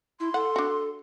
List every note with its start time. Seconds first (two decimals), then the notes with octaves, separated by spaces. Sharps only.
0.20 E4 C6
0.34 A4 F#5
0.56 D4 F#4